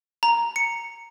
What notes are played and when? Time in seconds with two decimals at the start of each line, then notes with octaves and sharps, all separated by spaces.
0.23 A#5
0.56 C#7